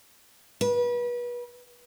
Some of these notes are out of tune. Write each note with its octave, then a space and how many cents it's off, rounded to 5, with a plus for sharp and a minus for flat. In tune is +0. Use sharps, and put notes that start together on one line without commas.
B4 -30